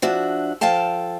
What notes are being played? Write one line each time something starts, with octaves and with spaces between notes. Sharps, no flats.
F3 D4 F#4 E5
F3 A4 F5 G5 A5